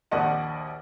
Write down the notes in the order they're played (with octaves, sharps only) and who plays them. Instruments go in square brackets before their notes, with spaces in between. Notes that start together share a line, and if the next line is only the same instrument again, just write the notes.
[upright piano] A#1 D#2 D5 D#5 F#5 A5